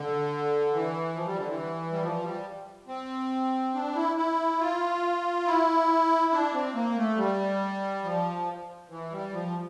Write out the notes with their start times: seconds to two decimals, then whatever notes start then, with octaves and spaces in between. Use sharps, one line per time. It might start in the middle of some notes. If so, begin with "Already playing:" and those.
Already playing: D3
0.73 E3
1.15 F3
1.26 G3
1.37 D3
1.48 E3
1.92 G3
2.02 F3
2.23 G3
2.87 C4
3.74 D4
3.95 E4
4.17 E4
4.60 F4
5.46 E4
6.32 D4
6.54 C4
6.75 A#3
6.97 A3
7.17 G3
8.04 F3
8.90 E3
9.12 G3
9.32 F3